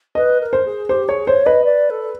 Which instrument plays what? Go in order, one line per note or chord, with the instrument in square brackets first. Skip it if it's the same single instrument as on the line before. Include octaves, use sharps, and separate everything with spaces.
[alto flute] B4 [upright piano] D#5
[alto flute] A#4
[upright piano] C5
[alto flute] G#4
[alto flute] G4 [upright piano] C5
[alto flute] G#4 [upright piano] C#5
[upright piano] C5 [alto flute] C#5
[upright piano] B4 [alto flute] D#5
[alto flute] D5
A4